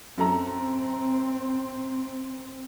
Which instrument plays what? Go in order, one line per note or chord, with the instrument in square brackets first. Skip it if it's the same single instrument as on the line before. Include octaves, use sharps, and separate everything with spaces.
[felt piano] F#2 A4 A#5 [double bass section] C4